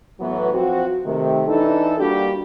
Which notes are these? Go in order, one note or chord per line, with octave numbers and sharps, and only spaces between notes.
A2 E3 F#3 B3
F3 F#3 C4 F#4
C3 D#3 A3
E3 D4 D#4 A4
G3 A#3 D4 F#4 G4